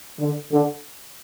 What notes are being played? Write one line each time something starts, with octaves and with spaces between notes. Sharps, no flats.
D3
D3